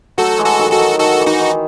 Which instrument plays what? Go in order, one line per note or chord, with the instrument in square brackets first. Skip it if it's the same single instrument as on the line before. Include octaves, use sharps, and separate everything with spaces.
[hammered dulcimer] F#3 A3 [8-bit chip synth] F#4 A4
[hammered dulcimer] E3 G#3
[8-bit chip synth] F#4 A4
[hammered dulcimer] D#3 F#3
[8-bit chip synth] F#4 A4
[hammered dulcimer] D#3 F#3
[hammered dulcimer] D#3 [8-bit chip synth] F#4 A4
[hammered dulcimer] E3
[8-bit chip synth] D#4 F#4
[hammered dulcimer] D#3